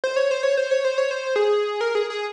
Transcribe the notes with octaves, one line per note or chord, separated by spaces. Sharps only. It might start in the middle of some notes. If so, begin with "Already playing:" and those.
C5
C#5
C5
C#5
C5
C#5
C5
C#5
C5
G#4
A#4
G#4
G#4